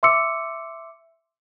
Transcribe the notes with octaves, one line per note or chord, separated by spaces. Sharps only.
E5 C6 D6 E6 C#7